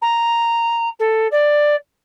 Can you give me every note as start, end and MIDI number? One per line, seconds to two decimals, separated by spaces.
0.01 0.89 82
0.99 1.27 69
1.31 1.75 74